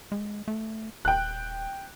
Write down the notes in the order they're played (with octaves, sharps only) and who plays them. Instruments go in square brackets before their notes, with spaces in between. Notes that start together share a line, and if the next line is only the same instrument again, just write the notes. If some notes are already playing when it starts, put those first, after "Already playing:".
[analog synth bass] G#3
A3
[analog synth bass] D#1 [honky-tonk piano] G5 F#6